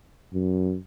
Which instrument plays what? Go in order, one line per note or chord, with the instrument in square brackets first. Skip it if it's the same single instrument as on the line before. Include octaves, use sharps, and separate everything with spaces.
[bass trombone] F#2